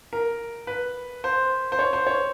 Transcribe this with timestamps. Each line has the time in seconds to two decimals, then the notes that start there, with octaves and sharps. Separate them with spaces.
0.13 A#4
0.67 B4
1.24 C5
1.72 C5
1.79 C#5
1.93 C5
2.07 C#5